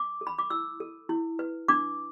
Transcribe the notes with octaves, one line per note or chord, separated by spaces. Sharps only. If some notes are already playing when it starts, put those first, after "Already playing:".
Already playing: D6
A4
B5
D6
E4 E6
A4
E4
B4
D4 D6